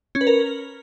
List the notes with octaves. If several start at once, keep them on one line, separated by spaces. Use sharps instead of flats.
C#4
B4
A#4